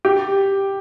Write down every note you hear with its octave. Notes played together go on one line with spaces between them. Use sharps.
G4